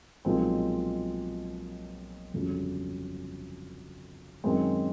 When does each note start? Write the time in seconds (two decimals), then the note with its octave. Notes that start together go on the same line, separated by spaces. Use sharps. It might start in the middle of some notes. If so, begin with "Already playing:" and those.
0.25 B1 A#2 F3 G#3 C4
2.34 G1 F2 C#3 F#3
4.44 F#2 D#3 G#3 C4